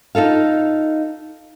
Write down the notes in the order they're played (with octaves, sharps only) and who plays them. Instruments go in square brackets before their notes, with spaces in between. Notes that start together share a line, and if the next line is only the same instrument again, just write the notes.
[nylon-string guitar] D#4 F4 A4 F5